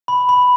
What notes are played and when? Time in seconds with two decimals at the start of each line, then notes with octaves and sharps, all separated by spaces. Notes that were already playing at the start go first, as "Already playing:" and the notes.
0.08 B5
0.29 B5